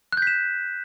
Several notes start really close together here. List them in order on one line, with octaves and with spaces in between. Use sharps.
F#6 G6 B6 E7